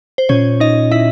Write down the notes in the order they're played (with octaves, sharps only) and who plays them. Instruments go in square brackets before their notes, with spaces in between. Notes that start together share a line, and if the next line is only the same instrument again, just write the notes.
[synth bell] C5
[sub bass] A#2 [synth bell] C#4 C#5
[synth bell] D#4 D#5
E4 E5